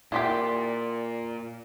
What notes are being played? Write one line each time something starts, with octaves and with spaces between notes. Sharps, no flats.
A#2 E4 F4 G4 D5 C6 B6